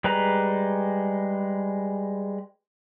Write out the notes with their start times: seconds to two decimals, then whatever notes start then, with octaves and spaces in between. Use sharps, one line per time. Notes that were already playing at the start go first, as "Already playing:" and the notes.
0.04 G3 G#3 B4 A#5